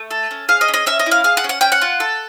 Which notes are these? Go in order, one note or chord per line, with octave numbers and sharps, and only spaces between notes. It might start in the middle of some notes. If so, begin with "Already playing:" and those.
Already playing: A3
A4
C#4
G#4 F5
D#5
C#4
D#5
C#4 E5
D#5
E4
F5
G#4 F5
F#5
C#4
F#5
C#4 G5
F#5
F4
A4